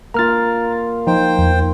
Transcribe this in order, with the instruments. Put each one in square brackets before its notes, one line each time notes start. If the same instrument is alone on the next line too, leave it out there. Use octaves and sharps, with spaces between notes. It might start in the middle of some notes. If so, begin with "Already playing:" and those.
[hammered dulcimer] A#3 F4 [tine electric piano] A#5 F6 A6
[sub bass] F3 [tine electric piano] D#4 [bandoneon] C5 G5
[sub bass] E2